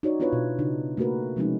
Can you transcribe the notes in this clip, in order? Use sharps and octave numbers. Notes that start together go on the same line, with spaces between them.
D#4 F#4 C#5 D5
B3 D4 E4 F4 B4 C#5
B2
C#3 D4 D#4
A3 A#3 F#4 A#4 B4
C3 F3 G#3 C4 C#4 D#4